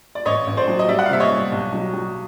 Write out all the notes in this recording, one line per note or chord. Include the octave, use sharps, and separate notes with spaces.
D5
A1 C#5 D#5
A1
C5 D5
F#3
D#5
G3 D5 E5
F#5
F5
C3 E5
C#5 D#5
G3
B1
F#3
F#3